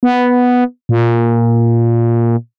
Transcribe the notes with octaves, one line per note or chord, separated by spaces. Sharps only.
B3
A#2